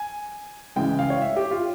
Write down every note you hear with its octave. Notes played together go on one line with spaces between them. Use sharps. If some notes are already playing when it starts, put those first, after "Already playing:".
Already playing: G#5
C#3 E3 G#3 G5
F5
C#5
E5
G4
F4